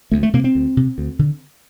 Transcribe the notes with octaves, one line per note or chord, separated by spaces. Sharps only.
D2 A3
A3
C3 A#3
C4
D2
C3
D2
D3